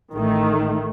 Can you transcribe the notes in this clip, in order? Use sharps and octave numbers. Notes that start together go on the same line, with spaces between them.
A1 D#3 A3